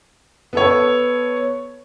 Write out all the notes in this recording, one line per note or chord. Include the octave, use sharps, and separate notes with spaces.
B3 A4 C#5